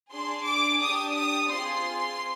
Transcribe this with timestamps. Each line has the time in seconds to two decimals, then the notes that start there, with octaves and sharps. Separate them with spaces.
0.11 D4 G#4 C6
0.46 D6
0.81 D4 G4 D#6
1.16 D#6
1.50 C4 F4 G#4 C6